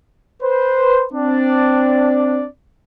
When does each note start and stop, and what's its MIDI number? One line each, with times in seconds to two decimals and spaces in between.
0.43 1.05 71
0.43 1.05 72
1.13 2.46 60
1.13 2.46 62
1.13 2.46 74